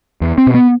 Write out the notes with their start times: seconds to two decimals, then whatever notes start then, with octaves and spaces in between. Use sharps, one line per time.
0.21 E2
0.38 C4
0.47 B2
0.54 B3